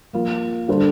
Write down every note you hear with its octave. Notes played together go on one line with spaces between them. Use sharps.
F3 A#3 F4
D3 G3 D4 A4 C5